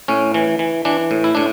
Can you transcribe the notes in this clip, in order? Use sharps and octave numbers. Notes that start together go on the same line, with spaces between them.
A2 C#4
E3
E3
E3 D4
A2
E4
A2 D4